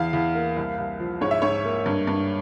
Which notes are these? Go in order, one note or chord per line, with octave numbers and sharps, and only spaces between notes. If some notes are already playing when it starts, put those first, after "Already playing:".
Already playing: E2 F5
E2
A#3
C2
C2
F3
G#2 C#5
E5
G#2 C#5
A#3
G2
G2